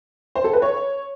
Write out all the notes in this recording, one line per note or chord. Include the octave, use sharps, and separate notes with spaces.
C5
A4
B4
C#5